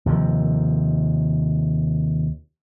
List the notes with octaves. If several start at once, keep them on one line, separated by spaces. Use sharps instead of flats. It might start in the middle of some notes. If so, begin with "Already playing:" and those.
D#2 C3 F3